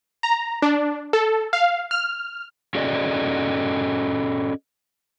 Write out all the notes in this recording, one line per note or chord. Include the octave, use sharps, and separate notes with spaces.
A#5
D4
A4
F5
F6
C#4 F#4 G#4 A4 D5 D#5